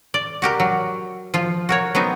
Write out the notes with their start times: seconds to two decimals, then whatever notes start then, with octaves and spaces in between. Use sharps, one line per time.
0.14 D5
0.42 F#4 G4 A#4
0.60 F#3
1.34 F3 F4
1.69 F#4 A#4 C#5
1.95 F#3 B3 C4 D#4